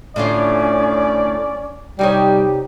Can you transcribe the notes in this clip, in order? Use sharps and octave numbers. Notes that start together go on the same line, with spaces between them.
A2 D3 C#4 F4 D5
C3 G3 D#4 G4 C#5